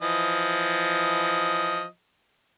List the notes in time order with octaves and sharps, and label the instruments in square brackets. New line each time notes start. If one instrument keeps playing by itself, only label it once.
[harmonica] E3 F3 D#5